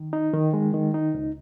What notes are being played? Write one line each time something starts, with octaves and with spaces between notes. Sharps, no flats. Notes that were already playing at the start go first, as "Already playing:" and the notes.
Already playing: D#3
D#4
D#3
G#3
D#3
D#4
C#2